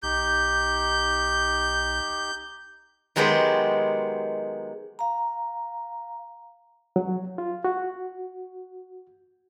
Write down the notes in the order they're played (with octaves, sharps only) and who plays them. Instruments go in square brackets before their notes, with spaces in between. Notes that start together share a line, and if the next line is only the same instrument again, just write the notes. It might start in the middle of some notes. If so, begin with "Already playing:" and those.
[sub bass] B1 [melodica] D#4 G4 [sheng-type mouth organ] G6
[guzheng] D#3 F#3 G#3 B3 G4 C5
[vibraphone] F5 A#5
[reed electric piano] F#3
F4
F#4